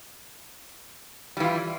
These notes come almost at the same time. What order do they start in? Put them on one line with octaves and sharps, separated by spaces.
G3 E3 F4